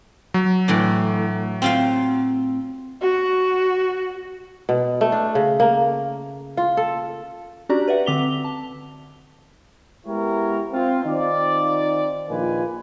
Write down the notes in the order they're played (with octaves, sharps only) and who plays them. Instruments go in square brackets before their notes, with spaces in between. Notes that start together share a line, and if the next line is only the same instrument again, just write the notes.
[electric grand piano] F#3
[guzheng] A2 E3 D4
C4 F4 F5
[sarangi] F#4
[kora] B2
A3
D4
C#3
A#3
F4
A4
[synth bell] C#4 D4 F#4 G4 D5 A#5
B4 D5 E5 F#5
D3 C4 D6 B6 F7 G7
A5
[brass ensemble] G#3 B3 E4 G4 A#4 C#5
C4 F4
D#3 C4 D#4 F4 D5
A#1 A#2 D#3 F4 B4 G#5